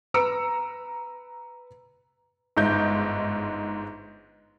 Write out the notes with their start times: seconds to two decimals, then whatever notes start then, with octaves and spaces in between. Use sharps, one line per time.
0.14 B4 A#5 E6 C#7 D7
2.57 G1 G#2 D#4 G6